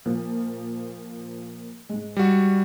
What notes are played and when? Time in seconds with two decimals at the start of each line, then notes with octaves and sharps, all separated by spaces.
0.05 A#2 F3 A#3
1.89 G#2 G#3
2.17 G3 F#4